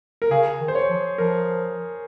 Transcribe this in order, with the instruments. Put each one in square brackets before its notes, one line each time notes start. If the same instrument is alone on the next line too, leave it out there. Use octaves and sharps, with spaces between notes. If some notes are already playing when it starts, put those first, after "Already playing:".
[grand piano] A#4
[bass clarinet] C#3 [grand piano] G#4
[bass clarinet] D#3
[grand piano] C5
C#5
[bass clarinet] F3
[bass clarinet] F3 [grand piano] A#4